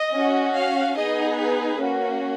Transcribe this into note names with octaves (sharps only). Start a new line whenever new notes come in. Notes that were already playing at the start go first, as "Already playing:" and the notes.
Already playing: D#5
C#4 F#4
F5
B3 D#4 G#4 D#5
B4
A#3 C#4 F#4